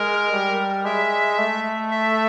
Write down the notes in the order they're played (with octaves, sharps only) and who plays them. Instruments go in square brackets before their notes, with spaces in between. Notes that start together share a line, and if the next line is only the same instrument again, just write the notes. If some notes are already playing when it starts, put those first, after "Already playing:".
Already playing: [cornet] G#3 [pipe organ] A#4
[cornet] G3
[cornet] G#3 [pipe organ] E5
[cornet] A3
[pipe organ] E5